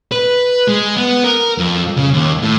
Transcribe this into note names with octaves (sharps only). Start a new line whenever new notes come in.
B4
G#3
B3
A#4
F2
C#3
D#2
A2